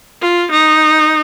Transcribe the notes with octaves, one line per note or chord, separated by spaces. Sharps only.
F4
D#4